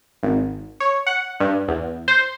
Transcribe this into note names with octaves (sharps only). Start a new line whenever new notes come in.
G#1
C#5
F#5
G2
E2
C5